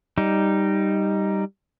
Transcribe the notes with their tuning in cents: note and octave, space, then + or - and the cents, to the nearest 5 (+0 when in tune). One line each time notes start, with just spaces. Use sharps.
G3 +0 D#4 +0